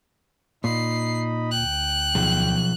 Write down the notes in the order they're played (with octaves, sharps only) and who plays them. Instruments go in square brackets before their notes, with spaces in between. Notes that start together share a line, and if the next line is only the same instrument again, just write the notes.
[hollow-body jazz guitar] A#2 [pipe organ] D#4 D#5 B5 [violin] C7
[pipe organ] D2 G5 [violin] F#6
[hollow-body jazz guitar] B1 [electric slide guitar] F3 G#4